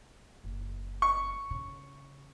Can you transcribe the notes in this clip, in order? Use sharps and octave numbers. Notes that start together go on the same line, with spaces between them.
F#1
C#6
C#3